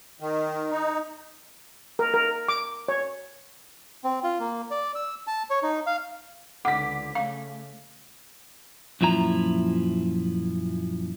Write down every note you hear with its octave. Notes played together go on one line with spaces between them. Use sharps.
D#3
D#4
A#4
A#4
D6
C#5
C4
F4
A#3
D5
E6
A5
C#5
D#4
F5
C#2 D3 F#5 D6 B6
C#3 A3 F5
F#2 A#2 F3 E4 A#5